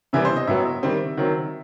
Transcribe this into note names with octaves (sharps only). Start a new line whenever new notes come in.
C3 E3 G3 B3 E5
C5
D#5
A2 F#3 B3 E5
D#3 G3 C4
D#3 F#3 C4